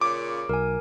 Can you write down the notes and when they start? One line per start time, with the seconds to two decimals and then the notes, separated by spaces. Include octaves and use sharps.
0.01 A#2 C#3 D6
0.49 B1 A#4 G#5